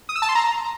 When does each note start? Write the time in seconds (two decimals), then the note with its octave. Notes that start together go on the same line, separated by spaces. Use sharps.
0.09 D#6
0.15 E6
0.22 A5
0.29 C6
0.35 A#5